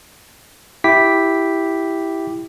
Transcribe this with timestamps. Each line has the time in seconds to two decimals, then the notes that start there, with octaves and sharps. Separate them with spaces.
0.84 E4 G4 G5 D6 B6